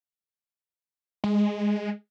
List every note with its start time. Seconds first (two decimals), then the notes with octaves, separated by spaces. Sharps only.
1.24 G#3